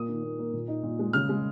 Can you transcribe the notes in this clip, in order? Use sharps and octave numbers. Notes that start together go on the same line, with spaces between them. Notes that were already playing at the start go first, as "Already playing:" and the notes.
Already playing: A#2 A#3 D#6
D#3
A#3
A#3
A#2
D#4
A#2
G#3
C#3 F6
G#3